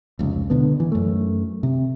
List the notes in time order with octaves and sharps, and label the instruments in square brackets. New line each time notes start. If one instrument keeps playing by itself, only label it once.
[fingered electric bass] F1 C#2
B2 D3 B3
E3
F#2 A3
C3